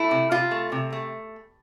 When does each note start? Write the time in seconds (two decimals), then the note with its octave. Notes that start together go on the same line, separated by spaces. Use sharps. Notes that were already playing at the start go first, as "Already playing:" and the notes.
Already playing: A3 E4
0.11 C3
0.31 C3 F4
0.51 A3
0.72 C3
0.92 A3